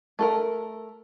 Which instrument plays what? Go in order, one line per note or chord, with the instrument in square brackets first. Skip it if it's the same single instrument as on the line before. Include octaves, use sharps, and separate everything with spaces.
[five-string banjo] A3 A4 A#4